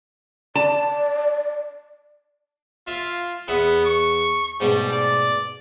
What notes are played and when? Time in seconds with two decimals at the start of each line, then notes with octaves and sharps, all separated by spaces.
0.55 D5 A5
2.87 F4 E5 F5
3.48 E2 B3 E5 F#5
3.85 C#6
4.60 G#2 B2 G3 A3
4.93 D5